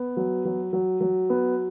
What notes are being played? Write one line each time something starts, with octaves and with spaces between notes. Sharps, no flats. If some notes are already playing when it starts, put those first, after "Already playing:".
Already playing: B3
F#3
F#3
F#3
F#3
B3